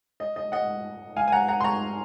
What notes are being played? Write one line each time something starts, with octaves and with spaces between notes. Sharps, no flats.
D#5
D#5
D#5 F#5
F5 G#5
G#5
F#5 A#5
F#5 A#5
C6
A#5 C#6